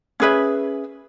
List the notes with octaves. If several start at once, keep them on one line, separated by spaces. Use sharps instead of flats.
C#4 G#4 B4 E5